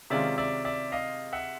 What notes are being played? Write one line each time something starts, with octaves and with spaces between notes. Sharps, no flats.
C3 D#3 G#3 C#4 F4 D5 E5
D5 E5
D5 E5
D#5 F5
E5 F#5